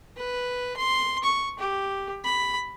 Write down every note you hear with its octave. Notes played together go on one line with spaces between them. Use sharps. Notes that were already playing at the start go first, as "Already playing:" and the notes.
B4
C6
C#6
G4
B5